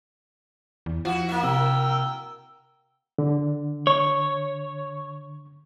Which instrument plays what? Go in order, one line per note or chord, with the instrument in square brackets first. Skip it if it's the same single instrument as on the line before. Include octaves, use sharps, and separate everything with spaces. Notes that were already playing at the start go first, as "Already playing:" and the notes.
[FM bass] E2
[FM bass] F3 [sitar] E4 F#4 [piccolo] F#5
[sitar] A#3 F#4 E5
[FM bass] C3 [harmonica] A#4 G5 [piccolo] E6
[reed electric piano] D3
[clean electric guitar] C#5